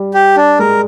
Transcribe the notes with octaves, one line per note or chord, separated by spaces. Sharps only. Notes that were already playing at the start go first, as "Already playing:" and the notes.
Already playing: G3
G4
D4
G#3 A#4